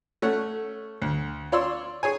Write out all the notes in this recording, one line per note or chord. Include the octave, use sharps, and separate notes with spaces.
A3 C#4 C#5 F#5
D2
F4 C#5 D5 C6 E6
G#4 C#5 G#5